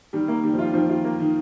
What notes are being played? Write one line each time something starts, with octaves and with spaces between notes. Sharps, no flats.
D#3 G3
A#3
D#3 G3
F3
G3 F4
D#3 F3
F4
A#3
D#3